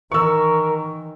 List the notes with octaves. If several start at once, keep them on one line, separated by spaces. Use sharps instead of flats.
D#3 E3 A#4 C#6 E6